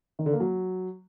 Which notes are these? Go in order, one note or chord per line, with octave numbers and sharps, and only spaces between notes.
D#3
D3
A#3
F#3